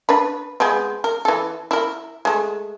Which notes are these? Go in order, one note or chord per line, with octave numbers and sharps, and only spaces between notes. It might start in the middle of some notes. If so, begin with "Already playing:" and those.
D4 B4 B5
G#3 B3 C4
A#4
E3 A4
E4 A#4
G#3 A3